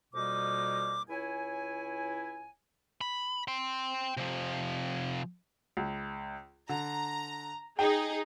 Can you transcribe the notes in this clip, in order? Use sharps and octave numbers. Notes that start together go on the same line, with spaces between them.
F2 B2 G3 A#3 D#4 D6
C#2 E4 C#5 G#5
B5
G5 C6
C3 F3
C#2
D3 A#5
D#4 G#4 G5